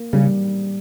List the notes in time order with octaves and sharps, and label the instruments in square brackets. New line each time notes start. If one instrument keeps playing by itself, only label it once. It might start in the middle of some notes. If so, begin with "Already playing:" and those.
Already playing: [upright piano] A#3
[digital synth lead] C#3 [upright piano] G3